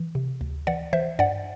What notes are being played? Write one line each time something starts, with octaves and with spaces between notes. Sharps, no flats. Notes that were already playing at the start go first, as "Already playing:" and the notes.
Already playing: E3
C3
D2
E3 D5 F#5
E3 C5 E5
G2 D5 F#5